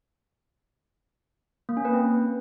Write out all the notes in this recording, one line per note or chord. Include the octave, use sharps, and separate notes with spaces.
A#3
C#4
B4
C4